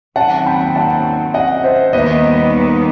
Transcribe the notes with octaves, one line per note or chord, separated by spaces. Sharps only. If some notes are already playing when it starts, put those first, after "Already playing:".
D#2 D#3 F#3 C4 F#5 A5
G5 B5
F#5 A5
D#5 F#5
C5 E5
D#2 D#3 G3 B3 B4 D#5